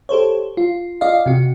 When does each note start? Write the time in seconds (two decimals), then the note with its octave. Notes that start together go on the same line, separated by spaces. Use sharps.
0.09 G4 A4 C5 C#5
0.57 F4
1.01 F4 D5 D#5 F5
1.26 C3 F#4